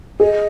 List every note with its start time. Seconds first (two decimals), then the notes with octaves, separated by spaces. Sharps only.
0.20 G#4 D#5